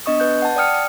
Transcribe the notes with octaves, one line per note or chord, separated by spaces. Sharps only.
B3 D4 D#5 C#6 D#6
B4 F#6 G6
F#5 A5
D5 G5 D#6 F6 C#7